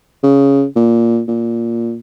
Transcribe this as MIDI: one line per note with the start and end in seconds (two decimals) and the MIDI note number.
0.23 0.65 49
0.76 1.22 46
1.28 1.97 46